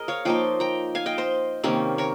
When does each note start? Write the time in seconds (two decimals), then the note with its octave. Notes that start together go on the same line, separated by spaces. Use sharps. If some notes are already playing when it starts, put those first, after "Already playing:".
Already playing: G#4 A#4 D#5
0.08 C#5 F5
0.25 F3 A#3 D#4 D#5 G5
0.60 G5 A#5
0.95 F5 G#5
1.06 D#5 G5
1.18 C5 D#5
1.64 C3 D#3 A#3 C#4
1.98 A#4 C#5